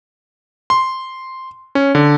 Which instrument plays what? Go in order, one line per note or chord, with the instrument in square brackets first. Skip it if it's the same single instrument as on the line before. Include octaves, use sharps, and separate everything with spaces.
[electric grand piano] C6
C#4
D3